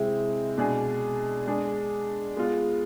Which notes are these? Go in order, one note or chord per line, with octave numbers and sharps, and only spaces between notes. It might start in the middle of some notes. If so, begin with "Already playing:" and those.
Already playing: C3 G#3 C4 E4
B2 G#3 D4 G#4
G#3 D4 G#4
G#3 B3 F4